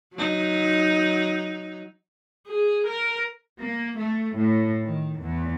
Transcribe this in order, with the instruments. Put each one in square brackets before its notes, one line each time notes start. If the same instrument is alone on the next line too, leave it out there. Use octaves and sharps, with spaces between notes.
[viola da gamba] F#3 D#4
[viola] G#4
A#4
[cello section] A#3
A3
A2
D#3
E2